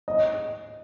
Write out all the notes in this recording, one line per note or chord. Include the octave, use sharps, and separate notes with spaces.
D#5